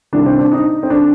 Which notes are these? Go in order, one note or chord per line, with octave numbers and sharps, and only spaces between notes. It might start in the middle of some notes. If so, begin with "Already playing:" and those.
C2 C3 D#3 D4
C4
D4
D#4
C4
D3 D4